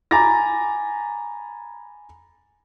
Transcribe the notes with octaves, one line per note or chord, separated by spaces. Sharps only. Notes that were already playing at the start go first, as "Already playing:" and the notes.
G#5 A#5 B5 D6 A6 A#6